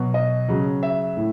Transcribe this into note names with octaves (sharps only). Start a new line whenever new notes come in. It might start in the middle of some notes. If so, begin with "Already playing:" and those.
Already playing: B2 F#3
D#5
C#3 F#3
E5
A2